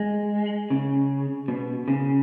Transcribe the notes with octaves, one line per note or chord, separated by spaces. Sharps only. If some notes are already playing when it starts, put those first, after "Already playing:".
Already playing: G#3
C#3
B2
C#3